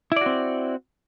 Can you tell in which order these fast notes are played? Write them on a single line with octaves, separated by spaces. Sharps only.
E4 D5 F#4 C4